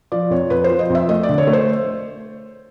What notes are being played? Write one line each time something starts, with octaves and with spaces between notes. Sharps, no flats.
F3 D5
F2 C#5
F2 B4
C5
F3
D#5
F2
E5
A3 D#5
D5
D3
C#5
A3
C5